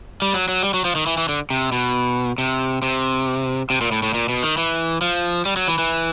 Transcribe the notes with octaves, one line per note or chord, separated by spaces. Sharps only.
G3
F#3
F#3
G3
F#3
F3
D#3
E3
E3
D3
C3
B2
C3
C3
C3
A#2
A2
A2
A#2
B2
D#3
E3
F3
G3
F#3
E3
E3